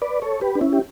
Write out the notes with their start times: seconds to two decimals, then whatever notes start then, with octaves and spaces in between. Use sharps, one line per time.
0.02 B4 D5
0.22 A4 C#5
0.41 G4 B4
0.55 D4
0.61 C#4 E4
0.73 G4